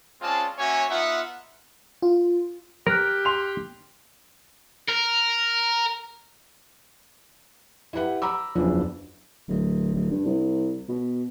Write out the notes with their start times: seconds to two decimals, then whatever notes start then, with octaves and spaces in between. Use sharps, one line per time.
0.21 G#3 C4 C#4 F4 D5 A5
0.59 A#3 C#4 F#4 C#5 E5 G#5
0.90 B3 D#4 F4 E5 F#5
2.02 F4
2.87 G4 A#4 F6 F#6
3.25 C6 F7
4.88 A#4
7.93 E4 G4 B4 F#5
8.22 A#5 B5 D6 E6
8.55 F#1 E2 E3 F3 D4
9.48 D1
9.94 D1
10.11 G2
10.25 C2
10.88 B2